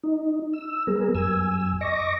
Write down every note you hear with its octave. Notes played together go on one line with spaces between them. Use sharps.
D#4
E6
G3 B3 G#4 A#4
F#2 G#5 E6
D#5 C#6 D6 A#6